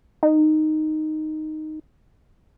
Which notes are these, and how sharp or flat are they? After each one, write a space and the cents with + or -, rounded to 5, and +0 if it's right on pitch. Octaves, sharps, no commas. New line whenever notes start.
D#4 -5